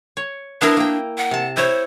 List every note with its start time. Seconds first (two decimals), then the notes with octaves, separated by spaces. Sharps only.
0.17 C#5
0.62 B3 D4 E4 A#4
0.77 A#3 G5
1.18 F#5
1.31 C3 A5
1.57 E4 C5 C#5